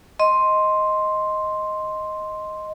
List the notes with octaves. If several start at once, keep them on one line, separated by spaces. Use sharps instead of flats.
D#5 C6